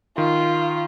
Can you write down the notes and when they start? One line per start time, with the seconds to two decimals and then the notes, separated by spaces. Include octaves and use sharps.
0.18 D#3 F4